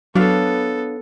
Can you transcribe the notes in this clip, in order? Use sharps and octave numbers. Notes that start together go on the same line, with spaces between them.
F#3 B3 D4 A4 C#5 F5